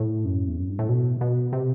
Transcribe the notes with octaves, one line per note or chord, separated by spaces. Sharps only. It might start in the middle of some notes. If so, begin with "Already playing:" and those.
Already playing: A2
F#2
E2
F#2
G2
A2
B2
B2
C3